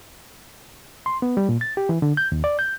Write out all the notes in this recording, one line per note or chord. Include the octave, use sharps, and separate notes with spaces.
C6
B3
G3
A#2
A6
G4
E3
D3
G6
D#2
D5
G6